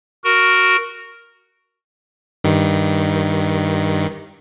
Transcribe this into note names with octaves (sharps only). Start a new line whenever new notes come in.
F#4 A#4
G2 D#3